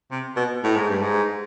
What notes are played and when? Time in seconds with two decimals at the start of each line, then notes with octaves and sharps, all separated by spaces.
0.11 C3
0.36 B2
0.64 A2
0.76 G#2
0.89 G2
1.02 G#2